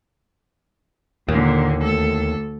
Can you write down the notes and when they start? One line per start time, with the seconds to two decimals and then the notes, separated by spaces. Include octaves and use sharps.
1.28 D#2 A#2 D3
1.81 D2 A4